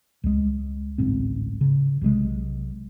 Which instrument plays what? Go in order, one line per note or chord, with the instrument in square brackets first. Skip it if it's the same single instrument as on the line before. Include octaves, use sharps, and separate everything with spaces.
[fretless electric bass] C#2 G#3
D1 A1 G#2 C4
C#3
B1 C3 G3 G#3